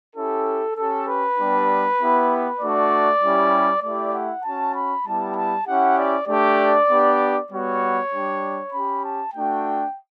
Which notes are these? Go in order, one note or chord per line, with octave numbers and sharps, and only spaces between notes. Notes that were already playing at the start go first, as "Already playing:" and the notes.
C#4 E4 G4 A4
C#4 G4 A4
B4
G3 B3 D4 G4
B3 E4 G4
A3 D4 F#4 D5
G3 C#4 E4 G4
A3 E4 G4 D5
F#5
C#4 F#4 A5
B5
G3 B3 E4 G4 A5
A5
C#4 E4 G4 F#5
D5
A3 D4 G4 D5
B3 D4 G4
G3 B3 F#4 C#5
G3 D4 G4
C#4 G4 B5
A5
A3 D4 F#4 G5